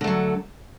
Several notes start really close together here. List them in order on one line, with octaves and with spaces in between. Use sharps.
D3 A3 F#3